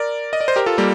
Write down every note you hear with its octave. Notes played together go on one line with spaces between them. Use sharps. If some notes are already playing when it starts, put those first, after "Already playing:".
Already playing: A#4 D5
D#5
D5
C5
G4 A#4
F4 A4
G3 A#3